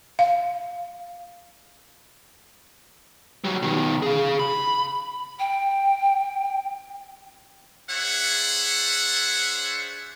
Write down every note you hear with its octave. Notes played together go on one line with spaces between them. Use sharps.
F5
F#3 G3
B2 D#3
G#4 F5
B5
G5
D4 G#4 C5 C#5 E5 F#5